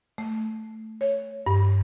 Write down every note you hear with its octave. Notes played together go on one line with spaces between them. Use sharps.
A3
C#5
G2